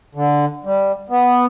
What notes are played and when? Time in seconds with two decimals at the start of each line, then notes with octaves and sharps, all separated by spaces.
0.15 D3
0.65 G3
1.09 B3